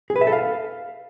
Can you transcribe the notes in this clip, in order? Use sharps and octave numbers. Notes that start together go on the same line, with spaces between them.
G#4
B4
E5
A4
F5